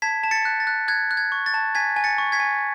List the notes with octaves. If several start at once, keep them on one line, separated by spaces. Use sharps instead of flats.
A5 G#6 B6
A5
A6 C#7
F#6
A6
F#6
F#6 G#6
F#6
G#6
C#6
A6
A5
G#5 G#6 B6
G#5
A6 C#7
C#6
G#6 B6
G#5